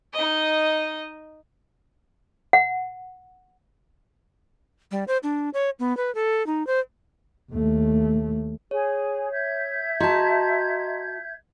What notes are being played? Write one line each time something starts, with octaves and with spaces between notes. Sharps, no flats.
D#4 D#5
F#5
G3
C5
D4
C#5
B3
B4
A4
D#4
C5
D#2 A3
G#4 C#5
E5 G6 G#6
F#4 D#5 A5 A#5 C6